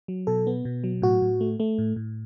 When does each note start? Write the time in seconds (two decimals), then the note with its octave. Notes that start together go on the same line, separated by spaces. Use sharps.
0.08 F#3
0.27 B2 A4
0.47 B3
0.65 B2
0.84 F#3
1.02 A2 F#4
1.22 A2
1.41 A3
1.60 A3
1.78 A2
1.96 A2